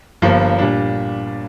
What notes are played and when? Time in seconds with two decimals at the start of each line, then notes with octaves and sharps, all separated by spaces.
0.22 G1 G2 F3 A#3 D4
0.59 A#2 G3 D4